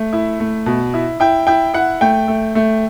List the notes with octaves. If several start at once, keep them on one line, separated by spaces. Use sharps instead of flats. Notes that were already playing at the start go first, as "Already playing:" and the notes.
Already playing: A3
E4
A3
B2
E4
E4 G5
E4 G5
E4 F#5
A3 G5
A3
A3